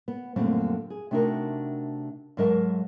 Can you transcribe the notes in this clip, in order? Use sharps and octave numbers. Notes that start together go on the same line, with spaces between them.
B3
F#2 A#2 D3 G3 A3 C4
G#4
C3 A3 D4 D#4 F#4 A#4
G#2 F#3 A#4 D#5 E5 A5